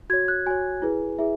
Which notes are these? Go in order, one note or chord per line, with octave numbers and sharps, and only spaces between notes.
F#4 C#5 G#6
F#6
F#4 C#5 G#5
E4 G#4 B4
E4 G#4 E5